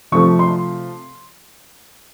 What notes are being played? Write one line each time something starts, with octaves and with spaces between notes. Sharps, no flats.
C3 F3 A3 C#6
C6